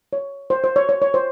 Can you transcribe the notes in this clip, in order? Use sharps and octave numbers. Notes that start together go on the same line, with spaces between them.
C#5
C5
C5
C#5
C#5
C#5
C5